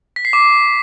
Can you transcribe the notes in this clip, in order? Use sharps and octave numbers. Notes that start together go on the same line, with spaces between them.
B6
C7
D6